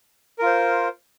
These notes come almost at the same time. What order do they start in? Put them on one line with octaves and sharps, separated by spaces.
A#4 F4 C5